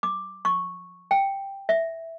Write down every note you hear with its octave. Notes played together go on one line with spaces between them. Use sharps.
D6
C#6
G5
E5